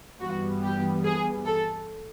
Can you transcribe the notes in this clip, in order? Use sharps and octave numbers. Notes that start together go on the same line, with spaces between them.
G2 E3 G3 B3 F#4
G4
G#4
A4